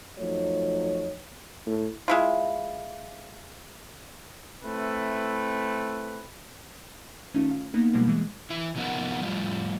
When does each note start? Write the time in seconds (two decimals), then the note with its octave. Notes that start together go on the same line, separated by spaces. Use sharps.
0.19 F2 F3 F#3 A3 D#4 C#5
1.66 A2
2.08 G#3 E4 F4
4.64 A3 C4 E4 B4
7.34 D#3 A3 C#4 D#4 F4
7.51 F5
7.74 A#3 B3 D#4
7.94 B2 F3 G3 G#3 A#3 B3
8.08 E3 G#3
8.50 E3 E4
8.75 C3 F3 B3 D#4 A#4 F#5
9.22 A2 F3 G3